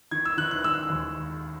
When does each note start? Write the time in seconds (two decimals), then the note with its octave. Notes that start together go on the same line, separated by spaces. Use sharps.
0.11 D#3 G#6
0.25 E6
0.38 D#3 F#6
0.51 F#6
0.64 G#3 E6
0.90 D#2